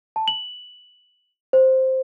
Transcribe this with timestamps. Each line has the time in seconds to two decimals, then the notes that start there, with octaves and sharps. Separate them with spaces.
0.16 A5
0.28 F#7
1.53 C5